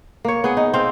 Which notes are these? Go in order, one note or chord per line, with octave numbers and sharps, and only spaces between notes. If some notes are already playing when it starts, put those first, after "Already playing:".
A#3 C#5
B3 G#4
D#4
C4 F5